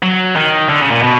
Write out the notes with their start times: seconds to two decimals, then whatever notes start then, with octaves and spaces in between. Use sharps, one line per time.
0.02 F#3
0.36 D#3
0.69 D3
0.80 C#3
0.91 A#2
1.02 B2